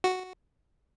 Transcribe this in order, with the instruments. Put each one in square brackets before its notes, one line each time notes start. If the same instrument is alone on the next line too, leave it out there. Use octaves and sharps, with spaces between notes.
[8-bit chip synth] F#4